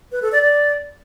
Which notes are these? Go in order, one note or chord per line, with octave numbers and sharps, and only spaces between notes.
B4
A4
D5
D5